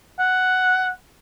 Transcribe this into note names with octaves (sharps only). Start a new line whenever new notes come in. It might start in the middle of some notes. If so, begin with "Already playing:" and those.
F#5